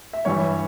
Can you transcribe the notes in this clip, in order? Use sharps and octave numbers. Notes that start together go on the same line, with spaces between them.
E5
G2 E3 G3 C#5